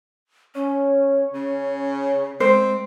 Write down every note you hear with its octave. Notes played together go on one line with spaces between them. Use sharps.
C#4 C#5
C#3 C#4
G#3 C4 C5